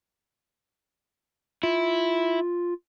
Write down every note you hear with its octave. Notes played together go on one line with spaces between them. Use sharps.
E4 F4